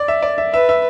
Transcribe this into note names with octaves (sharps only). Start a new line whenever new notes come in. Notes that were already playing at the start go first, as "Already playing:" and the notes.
Already playing: D5
E5
D5
E5
B4 E5
E5